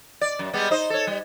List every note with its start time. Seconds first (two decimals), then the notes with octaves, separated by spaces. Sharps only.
0.21 D5
0.39 F#2
0.53 G3 G#3 B3
0.71 D#4 C5 D#5
0.90 A4 C#5
1.07 G3